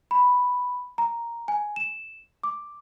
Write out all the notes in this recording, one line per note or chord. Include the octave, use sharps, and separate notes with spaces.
B5
A#5
G#5
E7
D6